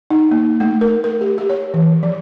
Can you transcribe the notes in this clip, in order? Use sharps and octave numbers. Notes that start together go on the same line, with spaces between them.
D#4
A#3
A3
A#4
A#4
G4
G4
C#5
E3
F3